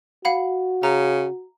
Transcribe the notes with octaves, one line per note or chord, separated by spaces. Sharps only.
F#4 F5 F#5 B5
C#3 A#5